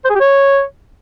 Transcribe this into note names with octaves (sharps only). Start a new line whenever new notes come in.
C5
G#4
G4
C#5